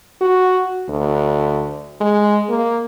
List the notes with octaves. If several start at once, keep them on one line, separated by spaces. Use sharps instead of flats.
F#4
D2
G#3
A#3